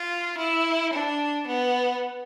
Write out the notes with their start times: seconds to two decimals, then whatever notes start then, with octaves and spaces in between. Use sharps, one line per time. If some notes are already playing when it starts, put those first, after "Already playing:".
Already playing: F4
0.38 E4
0.93 D4
1.48 B3